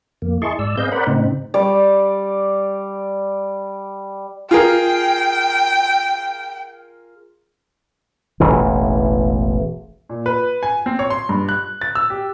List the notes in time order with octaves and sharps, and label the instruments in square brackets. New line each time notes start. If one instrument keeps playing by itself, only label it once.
[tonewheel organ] F2 A#3
E4 G#4 D#5 A5 C6 C#6
G#2 D5 E6
C4 G#4 B4 D#5 F5 G6
A#4 C5 D5 F#5 B5
A2 C#3 C4 D#4
[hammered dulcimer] G3 D5
[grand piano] F4 G#4 A#4 [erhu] G5
[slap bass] E1 A1 E3
[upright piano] A#2
B4
G#5
C4
C#5
C6
G2
F#6
A6
E6
G4